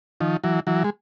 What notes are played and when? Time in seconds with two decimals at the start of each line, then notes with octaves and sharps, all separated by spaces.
0.20 D#3 F3
0.44 E3 F#3
0.67 E3 F#3
0.84 G#3